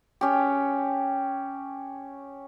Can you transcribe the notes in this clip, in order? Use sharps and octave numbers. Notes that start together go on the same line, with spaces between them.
C#4 G4